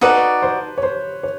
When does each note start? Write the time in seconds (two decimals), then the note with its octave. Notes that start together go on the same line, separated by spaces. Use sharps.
0.01 D#4 F#4 A4 B4 D5
0.42 C5
0.78 C#5
0.83 C5
1.23 C#5